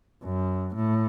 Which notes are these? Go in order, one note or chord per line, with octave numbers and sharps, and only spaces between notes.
F#2
A2